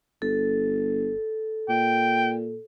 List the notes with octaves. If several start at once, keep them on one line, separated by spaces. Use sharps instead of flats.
G1 A4
A#2 G5